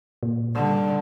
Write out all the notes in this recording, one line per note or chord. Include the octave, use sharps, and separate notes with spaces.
A#2
D3 G3